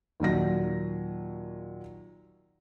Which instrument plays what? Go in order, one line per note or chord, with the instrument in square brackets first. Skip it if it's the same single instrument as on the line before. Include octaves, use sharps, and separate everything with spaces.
[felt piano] D#2 A#2 F#3 A#6